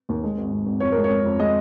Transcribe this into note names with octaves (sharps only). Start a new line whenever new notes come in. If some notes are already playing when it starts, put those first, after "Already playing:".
D#2
G#3
G#1
G#1
G#1
F2 C#5
G#3 A#4
C#5
G#3
F2
G#3 D#5